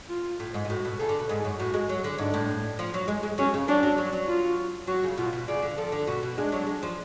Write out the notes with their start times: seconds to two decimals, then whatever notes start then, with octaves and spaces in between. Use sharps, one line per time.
0.09 F4
0.40 A2
0.54 G#2
0.65 B2
0.69 A2 F#4
0.85 B2
0.99 C#3 A4
1.09 D3
1.19 B2
1.29 G#2 G#4
1.45 F#2
1.59 A2 F#4
1.74 G#3
1.89 F#3
2.04 D3
2.18 G#2 D4
2.34 A2
2.79 F3
2.94 F#3
3.08 G#3
3.23 G#3
3.38 F#3 C#4
3.54 C#3
3.68 F#3 D4
3.83 F#3
3.98 F#3
4.13 F#3
4.28 F4
4.87 F#3 F#4
5.03 C#3
5.17 B2 F4
5.33 B2
5.48 C#3 D5
5.62 D3
5.77 F3 A4
5.92 D3
6.07 B2 F#4
6.23 B2
6.38 G#3 D4
6.52 F#3
6.67 G#3
6.83 F3